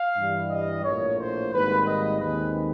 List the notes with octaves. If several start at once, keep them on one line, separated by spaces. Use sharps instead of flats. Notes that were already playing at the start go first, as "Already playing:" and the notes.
Already playing: F5
G2 E3 G3
D#5
A#1 A2 F3 A#3 C#5
C5
G#1 G#2 D#3 G3 A#3 B4
D#5
D#2 D#3 G#3 C4 B4